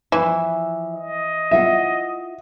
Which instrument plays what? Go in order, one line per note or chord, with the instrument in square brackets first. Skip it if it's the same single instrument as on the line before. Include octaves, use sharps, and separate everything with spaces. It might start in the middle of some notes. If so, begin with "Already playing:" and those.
[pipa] E3 [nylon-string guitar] F3 E4
[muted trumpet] D#5
[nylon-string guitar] E4 F4 F#5 [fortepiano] E5